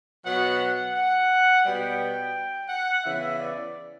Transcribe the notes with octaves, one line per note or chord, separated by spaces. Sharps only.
B2 F#3 B3 F#5
F#5
F#5
B2 G3 B3 G5
F#5
C#3 E3 B3 E5
D5